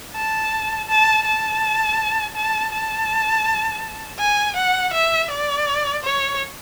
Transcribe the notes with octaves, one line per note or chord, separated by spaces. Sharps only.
A5
A5
A5
A5
A5
G#5
F#5
E5
D5
C#5